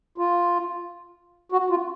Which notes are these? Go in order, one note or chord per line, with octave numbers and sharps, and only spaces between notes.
F4
F#4
F4